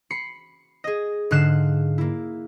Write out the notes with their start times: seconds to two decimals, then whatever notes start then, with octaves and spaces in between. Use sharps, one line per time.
0.11 B5 C7 C#7
0.84 G#4 D#5
1.31 G#2 D3 F5 F#6 C7 E7
1.98 A#3 E4